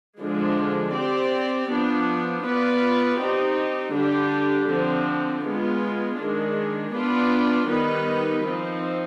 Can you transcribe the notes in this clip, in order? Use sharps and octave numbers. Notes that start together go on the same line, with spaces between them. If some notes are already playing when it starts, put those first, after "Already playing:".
D3 F3 G#3 D4
C4 G4 D5
F3 B3 D4
B3 F4 B4 D5
C4 D#4 G4
D3 G3 D4 G4
D3 F3 C4
G#3 B3 F4
D#3 G#3 D4
B3 D4 F4 B4 D5
D#3 G3 B3 D#4 B4
F3 C4 D#4